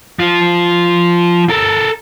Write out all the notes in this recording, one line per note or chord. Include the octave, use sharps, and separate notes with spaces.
F3 F4
A4 A#4